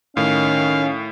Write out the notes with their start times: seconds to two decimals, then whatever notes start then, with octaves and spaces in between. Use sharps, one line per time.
0.17 A2 D#3 C#4 F5